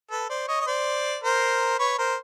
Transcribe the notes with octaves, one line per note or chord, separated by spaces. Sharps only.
A4 B4
C5 D5
C#5 D#5
D#5
C5 D5
A#4 C5
B4 C#5
A#4 C5